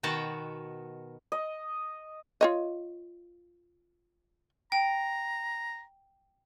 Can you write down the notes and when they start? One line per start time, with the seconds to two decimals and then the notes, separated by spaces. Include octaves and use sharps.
0.03 B2 D#3 B3 F#4 G5 A5
1.32 D#5
2.41 F4 C#5 D#5
4.72 G5 A#5